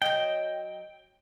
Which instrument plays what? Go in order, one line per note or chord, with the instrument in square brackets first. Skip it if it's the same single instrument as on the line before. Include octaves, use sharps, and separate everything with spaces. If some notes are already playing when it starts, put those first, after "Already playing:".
[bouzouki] F#3 D#5 [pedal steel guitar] G5